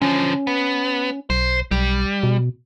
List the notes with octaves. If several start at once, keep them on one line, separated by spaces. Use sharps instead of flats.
D3 F3 C#4
B3
B1 C5
B1 G3
B2